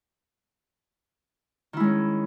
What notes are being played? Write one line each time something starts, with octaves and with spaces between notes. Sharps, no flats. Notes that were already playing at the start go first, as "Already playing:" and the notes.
D#3 G#3 C#4 E4